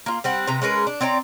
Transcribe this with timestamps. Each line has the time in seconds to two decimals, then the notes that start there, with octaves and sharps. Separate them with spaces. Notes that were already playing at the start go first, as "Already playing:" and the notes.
0.06 A#3 F4
0.24 G3 C4 F#5
0.47 C3 B3 A#5
0.62 G#3 C#4 A#4 B4
0.87 D4
1.01 C4 C#5 D5 A#5